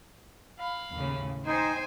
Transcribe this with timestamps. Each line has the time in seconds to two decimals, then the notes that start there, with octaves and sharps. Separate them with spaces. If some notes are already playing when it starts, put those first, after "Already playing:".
0.59 F5 B5
0.93 D#2 A2 C#3
1.46 D#4 C5 G5 G#5